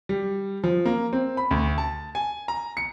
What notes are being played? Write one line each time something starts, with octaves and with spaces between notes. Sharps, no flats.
G3
F3
A#3
C4
B5
D2
A5
G#5
A#5
C#7